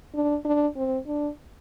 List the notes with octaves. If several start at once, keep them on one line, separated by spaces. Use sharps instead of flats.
D4
D4
C4
D4